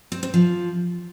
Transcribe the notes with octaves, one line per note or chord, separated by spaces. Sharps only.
C4
C4
F3